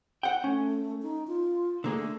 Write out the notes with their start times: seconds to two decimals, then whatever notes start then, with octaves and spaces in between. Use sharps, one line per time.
0.23 F#5 G5
0.44 A3 C#4
1.02 D#4
1.27 F4
1.84 D3 A3 A#3 G#4